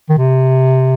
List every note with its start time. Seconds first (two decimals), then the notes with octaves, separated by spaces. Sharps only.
0.09 D#3
0.17 C3